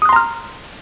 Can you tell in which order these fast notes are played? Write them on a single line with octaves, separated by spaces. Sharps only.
D#6 F#6 C6 A#5 F6